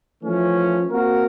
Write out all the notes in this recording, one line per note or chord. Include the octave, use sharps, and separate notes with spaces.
E3 F3 A3 C#4
A#3 C4 F#4 A#4